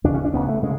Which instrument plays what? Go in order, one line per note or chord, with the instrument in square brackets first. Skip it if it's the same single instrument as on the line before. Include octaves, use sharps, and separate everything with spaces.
[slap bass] E2 C#3 D4
C#4
D4
D2 C#3 B3
A3
C#3 G#3